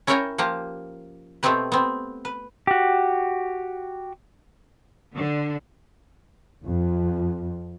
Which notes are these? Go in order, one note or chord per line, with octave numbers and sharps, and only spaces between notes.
C#4 E4 A#4 C#5 G5 A#5
F3 A#3 G4 A#5
B2 A3 B3 C4 G4 B4
B3 C4
B4
F#4 G4
D3
F2